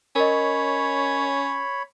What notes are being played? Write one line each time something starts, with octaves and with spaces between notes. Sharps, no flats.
C#4 A#4 C#5 D#5 B5